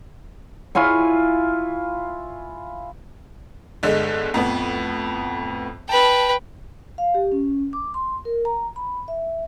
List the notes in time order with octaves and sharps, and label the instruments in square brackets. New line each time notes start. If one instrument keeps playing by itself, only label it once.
[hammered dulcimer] E4 F4 G#5 C#6
[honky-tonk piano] G1 D3 G#3
F2 A2 B3
[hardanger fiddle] B4 G5 [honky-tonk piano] A5
[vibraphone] F5
G4
C#4
D6
C6
A#4
A#5
B5
E5